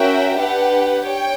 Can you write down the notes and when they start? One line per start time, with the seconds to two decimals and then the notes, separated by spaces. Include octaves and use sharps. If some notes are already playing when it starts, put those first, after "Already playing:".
Already playing: C#4 F#4 A#4 E5 G5
0.38 D4 G4 B4 F#5
1.06 C#5 G5